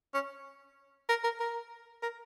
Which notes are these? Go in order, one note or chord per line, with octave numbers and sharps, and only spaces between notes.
C#4
A#4
A#4
A#4
A#4